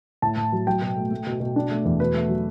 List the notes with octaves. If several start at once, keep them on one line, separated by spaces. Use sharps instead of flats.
A2 A5
A2
F#3
F#3 G5
B2
A3
A3
B2
B2
D4
A3
E2
B2 B4
A3
F#3